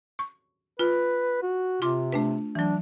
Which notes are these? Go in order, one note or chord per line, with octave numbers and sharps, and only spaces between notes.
C#6
F4 B4
F#4
C3 F4 C6 D6
A3 D4 B4
E3 F#3 D4